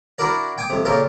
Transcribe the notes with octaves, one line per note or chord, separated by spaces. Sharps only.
D4 E4 F#4 A#4 D5
G5 G#5 D6 D#6
F2 C3
A#2 C#3 G4 A4 A#4